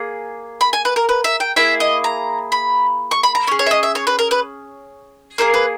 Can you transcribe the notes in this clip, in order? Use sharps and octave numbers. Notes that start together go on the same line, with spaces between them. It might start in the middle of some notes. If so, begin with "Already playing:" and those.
Already playing: A#3 G#4
B5
G#5
B4
A#4
B4
E5
G5
A#3 E4 G#4 E5
D#5
A#5
B5
C#6
B5
A#5
C#4 G#4 C#5
C#5
E5
D#5
E5
C#5
B4
A#4
B4
A#3 D#4 G#4 A#4
B4